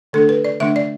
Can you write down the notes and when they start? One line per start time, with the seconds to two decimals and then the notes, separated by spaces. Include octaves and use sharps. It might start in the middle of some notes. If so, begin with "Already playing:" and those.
0.13 D3 A3 D4 A4
0.29 B4
0.44 D5
0.60 D3 A3 D4 E5
0.76 D5